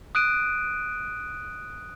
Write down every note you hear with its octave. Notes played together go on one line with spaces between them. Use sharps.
D#6 F#6 D7 D#7